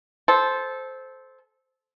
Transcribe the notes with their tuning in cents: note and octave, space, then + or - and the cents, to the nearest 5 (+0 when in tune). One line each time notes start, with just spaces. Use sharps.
A4 -20 C5 +0